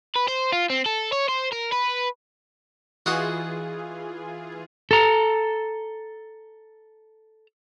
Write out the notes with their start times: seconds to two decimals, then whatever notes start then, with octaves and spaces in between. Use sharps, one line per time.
0.16 B4
0.28 C5
0.52 F4
0.70 C4
0.86 A4
1.13 C#5
1.29 C5
1.53 A#4
1.73 B4
3.06 E3 F4 F#4 G#4 D#5 F#5
4.91 A4 A#5